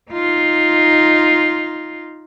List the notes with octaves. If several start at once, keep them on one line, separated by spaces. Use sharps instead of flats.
D#4 F4